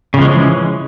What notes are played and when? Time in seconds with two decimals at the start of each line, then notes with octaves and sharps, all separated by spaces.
0.14 C#3
0.18 F3
0.21 G#3
0.25 C#4
0.29 E3